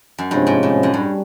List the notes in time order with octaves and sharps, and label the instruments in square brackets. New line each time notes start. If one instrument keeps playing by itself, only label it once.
[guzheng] F#2
[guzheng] G2 [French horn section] C3 F3 G#3 C#4
[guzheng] G#2
A2
F#2
[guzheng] G2 [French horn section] G3